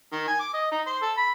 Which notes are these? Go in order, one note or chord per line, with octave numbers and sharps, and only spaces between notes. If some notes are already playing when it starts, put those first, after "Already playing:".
D#3
G#5
D6
D#5
D#4
C5
A4
B5